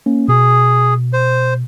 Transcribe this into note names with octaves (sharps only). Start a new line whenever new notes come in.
A#3 C#4
B2 G#4
C5